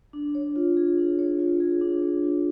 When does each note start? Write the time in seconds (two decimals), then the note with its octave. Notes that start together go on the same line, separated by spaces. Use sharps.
0.13 D4
0.35 C#5
0.56 F4
0.77 G#4
0.98 D4
1.19 C#5
1.39 F4
1.60 G#4
1.81 D4
2.02 C#5
2.24 F4